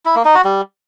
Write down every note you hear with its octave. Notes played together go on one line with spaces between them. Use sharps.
E4
A#3
D#4
F#4
G3